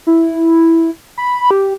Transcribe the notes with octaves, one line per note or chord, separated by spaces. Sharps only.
E4
B5
G4